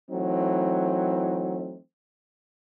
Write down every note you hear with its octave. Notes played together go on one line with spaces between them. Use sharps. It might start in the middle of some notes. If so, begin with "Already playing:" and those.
E3 F#3 A3 C4 D#4